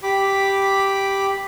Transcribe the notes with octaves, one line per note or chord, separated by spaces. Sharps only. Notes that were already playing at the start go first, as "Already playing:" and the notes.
G4 B5 D6